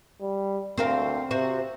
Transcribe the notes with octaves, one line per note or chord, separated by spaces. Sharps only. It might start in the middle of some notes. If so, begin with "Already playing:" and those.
G3
D2 C4 A#4 F5
C3 F#4 C5